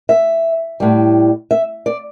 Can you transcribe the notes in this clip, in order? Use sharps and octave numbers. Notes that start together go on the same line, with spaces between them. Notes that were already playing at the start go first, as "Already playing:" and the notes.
E5
A2 G3
E5
D5